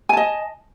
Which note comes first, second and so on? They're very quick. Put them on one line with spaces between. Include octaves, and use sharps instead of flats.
G#5 A5 D#5